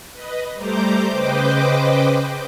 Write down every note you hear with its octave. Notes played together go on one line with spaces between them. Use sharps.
B4 D#5
G3 A3 C5 A#5 D6 G6
C#3 B4 C5 D#5 G5 D6